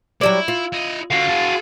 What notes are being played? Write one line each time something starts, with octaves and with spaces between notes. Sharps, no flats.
F#3 G3 E4 D5
F4
E4 D#5
D3 F#4 F5
G#4 A5